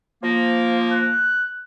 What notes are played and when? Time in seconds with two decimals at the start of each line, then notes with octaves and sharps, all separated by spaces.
0.23 F3 A#3
0.92 F#6